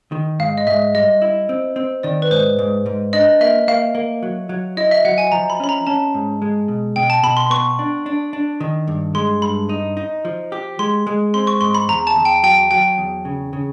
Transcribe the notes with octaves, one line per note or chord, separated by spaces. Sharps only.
D#3
G#2 F5
D#5
G#2 E5
G3 D#5
E4
C4
C4
D#3 D5
B4
G#2 C5
G#2
G#2
D4 D#5
A#3 E5
A#3 F5
A#3
F#3
F#3
E4 D#5
E5
F#3 F#5
G#5
F3 A#5
B5
C#4 B5
A#5
C#4 A5
G#2
G#3
B2
B2 G5
A5
B2 B5
C6
B3 C#6
D4
D4
D4
D#3
G2
G#3 C6
G2 B5
D#4
D#4
F3
G4
G#3 C6
G#3
C4 C6
C#6
G#2 C6
B5
E2 A#5
A5
E2
G5
F#3 G5
F#3 G5
E2
C#3
C#3